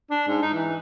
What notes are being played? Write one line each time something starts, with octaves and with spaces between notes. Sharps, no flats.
D4
G#2
D#4
E3